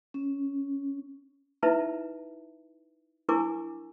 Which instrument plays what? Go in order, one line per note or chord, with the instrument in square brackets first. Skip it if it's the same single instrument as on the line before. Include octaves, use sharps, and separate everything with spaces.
[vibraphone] C#4
[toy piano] D#4 E4 B4 E5 A5 A#5
D4 E4 A#4 G#5 C#6 D6